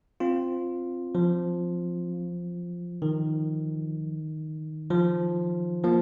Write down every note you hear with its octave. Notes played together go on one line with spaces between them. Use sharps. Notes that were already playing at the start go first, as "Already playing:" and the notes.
C4 F4
F3
D#3
F3
F3 A#3